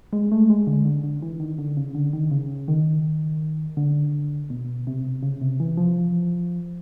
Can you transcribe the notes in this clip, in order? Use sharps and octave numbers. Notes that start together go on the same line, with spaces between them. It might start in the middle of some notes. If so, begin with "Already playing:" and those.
G#3
A3
G#3
D3
D3
D3
E3
D#3
D3
C#3
D3
D#3
C#3
D#3
D3
B2
C3
C#3
C3
E3
F3